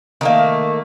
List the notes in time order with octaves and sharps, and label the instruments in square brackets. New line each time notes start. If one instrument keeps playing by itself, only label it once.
[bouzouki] D#3 A3 A#3